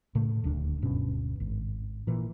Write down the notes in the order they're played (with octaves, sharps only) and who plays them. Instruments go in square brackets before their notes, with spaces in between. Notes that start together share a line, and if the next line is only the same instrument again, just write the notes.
[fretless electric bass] A2 C#3 A3
D#1 D2 D4
D1 G2 B2 C#4
G#1
A#2 E3